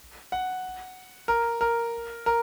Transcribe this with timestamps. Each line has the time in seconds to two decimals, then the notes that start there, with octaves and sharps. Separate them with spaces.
0.32 F#5
1.28 A#4
1.61 A#4
2.26 A#4